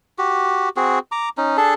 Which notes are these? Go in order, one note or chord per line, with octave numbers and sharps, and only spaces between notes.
F#4 G4
C4 F#4 G#4
A#5 D6
C#4 D#4
D4 G#4 A4 A5